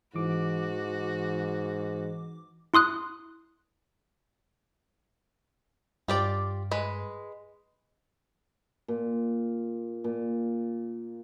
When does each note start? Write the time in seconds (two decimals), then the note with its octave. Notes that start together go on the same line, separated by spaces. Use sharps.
0.15 G#2 E3 F#4 D6
2.74 E4 C6 D#6 F#6
6.08 G2 F4 G4 D5
6.71 G#3 B4
8.88 A#2
10.04 A#2